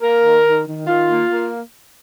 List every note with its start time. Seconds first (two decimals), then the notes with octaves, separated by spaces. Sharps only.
0.01 A#3 A#4
0.22 D#3
0.45 D#3
0.66 D#3
0.86 D#3 F4
1.08 A#3
1.29 A#3